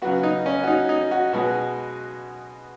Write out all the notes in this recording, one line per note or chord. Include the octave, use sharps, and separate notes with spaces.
C#3 F#3 B3 F#4
D#4
C#4
F#4
D#4
D#4
F#4
B2 G#3 B3 F#4